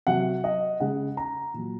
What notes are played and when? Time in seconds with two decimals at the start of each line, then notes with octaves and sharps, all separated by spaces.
0.07 C3 F#3 F#5
0.44 D#5
0.80 C#3 G#3 F#5
1.17 A#5
1.54 A#2 F#3